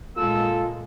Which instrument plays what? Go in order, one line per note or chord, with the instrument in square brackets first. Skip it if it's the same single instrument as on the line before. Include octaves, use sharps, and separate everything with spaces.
[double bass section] A#2 G#3 A#3 [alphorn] F4 [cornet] A4 [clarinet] E6